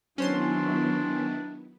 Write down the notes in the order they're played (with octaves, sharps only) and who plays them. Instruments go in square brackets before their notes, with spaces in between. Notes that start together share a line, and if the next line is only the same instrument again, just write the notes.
[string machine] D#3 B3 E4 [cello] F#3 [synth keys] C#4 C5 C6 [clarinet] D4